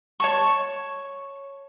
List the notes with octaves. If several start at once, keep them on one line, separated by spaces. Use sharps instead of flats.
C#5 A5 C#6